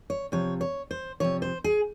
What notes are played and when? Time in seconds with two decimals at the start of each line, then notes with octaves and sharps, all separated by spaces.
0.10 C#5
0.32 C3 F3 C#5
0.61 C#5
0.91 C5
1.20 C3 F3 C#5
1.42 C5
1.64 G#4